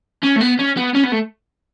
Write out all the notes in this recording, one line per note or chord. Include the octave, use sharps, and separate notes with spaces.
C#4
A3
B3
C#4
B3
C#4
B3
A3